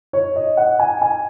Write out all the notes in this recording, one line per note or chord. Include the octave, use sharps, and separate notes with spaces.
C#5
D#5
F#5
G#5
G#5